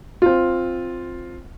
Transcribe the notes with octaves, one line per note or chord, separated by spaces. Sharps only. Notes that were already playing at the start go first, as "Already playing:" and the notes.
C4 F4